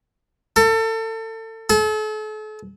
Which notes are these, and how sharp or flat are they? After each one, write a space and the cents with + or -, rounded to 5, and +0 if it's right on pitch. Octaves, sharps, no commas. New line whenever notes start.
A4 +30
A4 -40